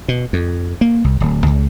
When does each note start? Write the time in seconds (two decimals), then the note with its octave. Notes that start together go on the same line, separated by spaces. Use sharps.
0.08 B2
0.33 F2
0.81 A#3
1.04 C2
1.20 D1
1.46 C#2